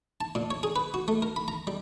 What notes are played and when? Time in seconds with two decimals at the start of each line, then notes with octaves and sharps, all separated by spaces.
0.21 A5
0.35 A#2
0.51 C#5
0.63 G#4
0.76 B4
0.94 F#4
1.08 A3
1.22 A#4
1.36 B5
1.48 A#5
1.67 G3